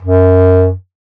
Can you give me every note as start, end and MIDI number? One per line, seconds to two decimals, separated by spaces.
0.02 0.72 42